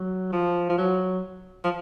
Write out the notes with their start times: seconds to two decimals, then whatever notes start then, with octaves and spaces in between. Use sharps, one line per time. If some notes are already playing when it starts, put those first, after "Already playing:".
Already playing: F#3
0.32 F3
0.69 F3
0.78 F#3
1.64 F3